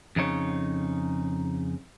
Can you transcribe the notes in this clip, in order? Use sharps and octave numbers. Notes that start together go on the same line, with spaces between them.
F2 C#3 D#4 C#5